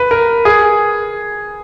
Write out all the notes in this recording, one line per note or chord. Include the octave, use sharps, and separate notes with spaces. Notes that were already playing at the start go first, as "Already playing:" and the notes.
Already playing: B4
A#4
G#4